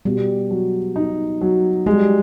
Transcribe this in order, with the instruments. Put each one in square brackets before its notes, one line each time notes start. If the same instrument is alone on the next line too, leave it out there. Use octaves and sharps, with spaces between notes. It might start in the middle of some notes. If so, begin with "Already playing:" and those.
[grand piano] B2 [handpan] G3
[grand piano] F#3
D#4
F#3
[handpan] G3 [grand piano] G#3